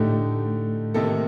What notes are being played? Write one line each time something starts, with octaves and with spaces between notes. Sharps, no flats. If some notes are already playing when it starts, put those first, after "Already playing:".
Already playing: A2 D3 A3 D#4 G4
C3 D#3 A#3 D#4 A4